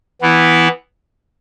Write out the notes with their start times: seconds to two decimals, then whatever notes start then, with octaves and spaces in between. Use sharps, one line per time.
0.21 E3 B3 E4